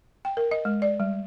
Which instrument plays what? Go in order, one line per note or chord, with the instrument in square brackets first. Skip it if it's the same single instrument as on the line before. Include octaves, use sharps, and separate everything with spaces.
[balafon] G5
A#4
D#5
G#3
D5
G3